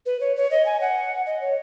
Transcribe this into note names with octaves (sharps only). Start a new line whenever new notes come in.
B4
C#5
C#5
D#5
G#5
F#5
D#5
C#5